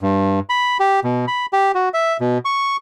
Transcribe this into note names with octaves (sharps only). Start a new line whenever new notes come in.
G2
B5
G4
B2
B5
G4
F#4
E5
B2
C#6